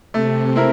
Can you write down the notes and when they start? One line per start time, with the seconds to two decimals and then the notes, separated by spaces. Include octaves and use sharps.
0.14 C3 A3
0.56 C4 E4 A#4